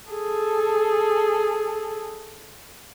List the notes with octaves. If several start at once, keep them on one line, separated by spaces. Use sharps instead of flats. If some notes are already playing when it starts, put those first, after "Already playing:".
G#4 A4